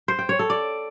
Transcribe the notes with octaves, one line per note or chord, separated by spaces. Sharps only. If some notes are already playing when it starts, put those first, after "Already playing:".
C5
G5
C#5
A4
D5